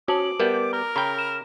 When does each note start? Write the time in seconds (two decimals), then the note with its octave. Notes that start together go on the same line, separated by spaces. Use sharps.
0.08 C#4 F#4 A5 D6 F#7
0.40 G3 B3 A#4
0.73 A#4 A#5
0.96 C#3 G5 A#5 B5
1.19 E7